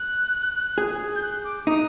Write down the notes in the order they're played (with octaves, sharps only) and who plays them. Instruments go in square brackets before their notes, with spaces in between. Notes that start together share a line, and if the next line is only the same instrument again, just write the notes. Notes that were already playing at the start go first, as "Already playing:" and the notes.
Already playing: [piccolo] F#6
[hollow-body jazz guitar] G#4
[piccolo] G6
F#6
D6
[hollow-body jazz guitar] D#4 [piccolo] D#6